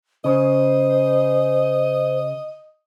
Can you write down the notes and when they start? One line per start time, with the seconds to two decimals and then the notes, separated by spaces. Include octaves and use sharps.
0.25 C#3 C5 D#5